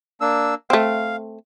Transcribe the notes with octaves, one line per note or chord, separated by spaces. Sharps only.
A#3 D4 E6
A3 C4 F5